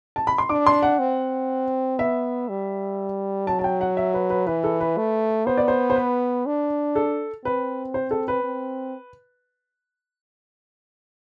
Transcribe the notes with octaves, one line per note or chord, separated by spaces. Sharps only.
A5
B5
C6
D4 D6
C6
F#5
C4
B3 E5
G3
F#3 A5
A5
G5
F#5
E5
B4
B4
E3 B4
A4
B4
A3
B3 C5
D5
C5
C5
B4
D4
A4
C4 B4
C5
A4
B4
C4